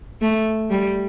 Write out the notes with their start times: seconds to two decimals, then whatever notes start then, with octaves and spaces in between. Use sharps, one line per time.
0.22 A3
0.70 G3